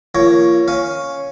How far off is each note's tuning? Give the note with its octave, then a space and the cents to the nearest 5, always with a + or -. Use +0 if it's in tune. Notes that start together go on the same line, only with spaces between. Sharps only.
F3 -40 A#3 +0 C#5 +0
C#4 +0 F5 +0